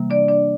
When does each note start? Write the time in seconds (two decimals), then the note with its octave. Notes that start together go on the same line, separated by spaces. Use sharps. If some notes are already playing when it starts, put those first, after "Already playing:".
Already playing: C3 E3 G3 A#3
0.10 D4 D5
0.28 D4 D5